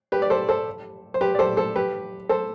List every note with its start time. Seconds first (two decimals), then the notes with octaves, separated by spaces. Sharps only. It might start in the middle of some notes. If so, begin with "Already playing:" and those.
0.12 G4 B4
0.22 D5
0.30 A4 C5
0.49 A4 C5
1.14 C5
1.21 G4 B4
1.35 D5
1.39 A4 C5
1.57 A4 C5
1.76 G4 B4
2.29 A4 C5